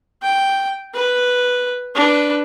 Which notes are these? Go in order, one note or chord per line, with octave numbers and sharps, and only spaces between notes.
G5
B4
D4 B4